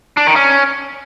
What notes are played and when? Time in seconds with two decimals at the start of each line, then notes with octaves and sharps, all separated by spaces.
0.17 D4
0.26 D#3
0.36 C#4